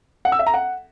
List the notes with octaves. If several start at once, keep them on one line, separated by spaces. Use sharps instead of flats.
F#5
E6
E5
A#5
F#5